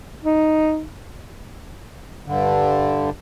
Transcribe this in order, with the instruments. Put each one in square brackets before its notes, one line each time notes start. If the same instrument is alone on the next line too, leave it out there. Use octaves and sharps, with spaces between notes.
[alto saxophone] D#4
[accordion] G2 D3